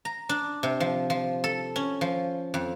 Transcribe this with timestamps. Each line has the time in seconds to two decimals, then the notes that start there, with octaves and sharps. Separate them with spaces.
0.05 A#5
0.29 D4
0.63 C3
0.80 F3
1.10 F3
1.44 A4
1.76 C#4
2.01 F3
2.54 F2